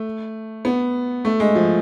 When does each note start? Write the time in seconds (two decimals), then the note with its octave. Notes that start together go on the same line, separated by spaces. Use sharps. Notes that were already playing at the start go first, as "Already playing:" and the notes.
Already playing: A3
0.65 B3
1.25 A3
1.40 G#3
1.55 F3